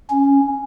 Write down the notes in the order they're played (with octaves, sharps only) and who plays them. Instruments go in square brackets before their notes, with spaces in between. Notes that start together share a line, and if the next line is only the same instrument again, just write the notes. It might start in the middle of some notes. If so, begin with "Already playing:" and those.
[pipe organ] C#4